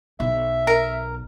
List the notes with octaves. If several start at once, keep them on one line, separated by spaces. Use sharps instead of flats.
B1 E5
A#4